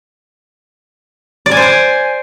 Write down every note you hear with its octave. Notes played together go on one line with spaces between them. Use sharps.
D5
G#5
C5
G#5